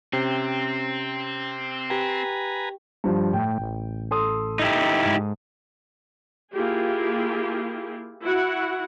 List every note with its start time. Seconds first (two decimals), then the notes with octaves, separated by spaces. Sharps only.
0.13 C3 C4 C#4 G5
1.90 G4 B4 G5 G#5 A#5
3.04 G2 F3
3.33 A2 G5
3.58 A1
4.11 A4 C6 D#6
4.59 D#4 E4 G4
5.06 G#2
6.53 A#3 E4 F4 G4 G#4
8.22 E4 F#4 F#5